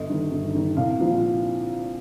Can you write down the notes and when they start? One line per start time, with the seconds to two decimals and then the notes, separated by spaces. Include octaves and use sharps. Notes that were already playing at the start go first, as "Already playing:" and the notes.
Already playing: G1 D#5
0.09 G2 D#3
0.31 G1
0.54 G2 D#3
0.77 C2 F5
0.99 A#2 F3